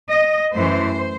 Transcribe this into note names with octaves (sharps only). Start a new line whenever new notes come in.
D#5
F#2 E3 A3 C5